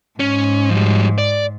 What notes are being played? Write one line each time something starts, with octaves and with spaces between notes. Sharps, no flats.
G#2 C#4
F3 G3
D5